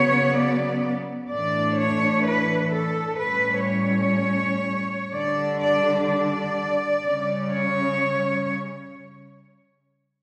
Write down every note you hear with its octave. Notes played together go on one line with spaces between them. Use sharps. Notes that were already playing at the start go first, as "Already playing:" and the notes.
Already playing: C#3 F#3 B3 C#5
D5
A2 E3 A3 D4 D5
C#5
B4
A4
A2 G3 C#4 B4
C#5
D3 G3 D4 D5
D5
D5
C#3 G3 C#4
C#5